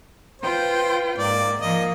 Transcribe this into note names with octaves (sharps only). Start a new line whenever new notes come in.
F4 B4 C5 G5
G#2 A#3 D5
F3 A#3 D#5